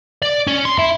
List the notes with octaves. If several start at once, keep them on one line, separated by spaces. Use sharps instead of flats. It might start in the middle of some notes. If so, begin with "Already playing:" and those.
D5
C#4
C6
E4